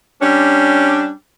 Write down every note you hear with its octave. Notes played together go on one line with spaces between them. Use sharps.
G3 C#4 D4